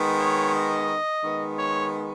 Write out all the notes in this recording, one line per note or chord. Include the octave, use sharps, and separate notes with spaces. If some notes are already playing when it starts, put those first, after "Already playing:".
Already playing: D#3 G#3 B3
C#5
D#5
D#3 G#3 B3
C#5